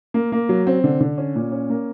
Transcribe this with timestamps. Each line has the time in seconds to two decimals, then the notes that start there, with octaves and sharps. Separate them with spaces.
0.14 A#3
0.32 A#3
0.49 F#3
0.67 C4
0.84 D3
1.01 D3
1.18 C#4
1.36 A#2
1.52 C#4
1.70 A#3